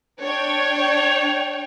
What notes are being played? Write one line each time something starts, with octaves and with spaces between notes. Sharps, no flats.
D4 C#5 G5